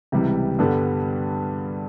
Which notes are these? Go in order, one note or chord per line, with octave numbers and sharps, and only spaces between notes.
C#2 C3 E3 G3
G2 D3 G3 B3